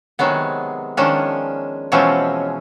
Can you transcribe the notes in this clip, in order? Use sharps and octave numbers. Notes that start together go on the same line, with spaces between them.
C3 D#3 F#3 G#3 B3
D#3 F3 G#3 C#4 D4
B2 E3 F3 G#3 C4 C#4